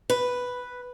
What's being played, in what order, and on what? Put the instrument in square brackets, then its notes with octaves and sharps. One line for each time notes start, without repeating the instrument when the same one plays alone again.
[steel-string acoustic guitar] B4